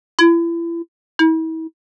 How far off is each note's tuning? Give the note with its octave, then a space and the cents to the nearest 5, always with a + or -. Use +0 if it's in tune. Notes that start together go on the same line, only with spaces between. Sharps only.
E4 +35
E4 -40